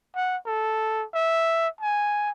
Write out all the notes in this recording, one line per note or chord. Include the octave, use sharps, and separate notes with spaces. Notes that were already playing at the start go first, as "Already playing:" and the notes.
F#5
A4
E5
G#5